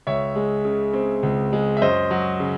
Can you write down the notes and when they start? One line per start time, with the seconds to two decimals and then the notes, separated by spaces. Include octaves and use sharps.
0.07 C#2 C#5 E5
0.35 G#3
0.65 C#3
0.93 C4
1.23 C#2
1.53 G#3
1.77 E5
1.82 F#2 C5 D#5
2.11 F#3
2.40 C#3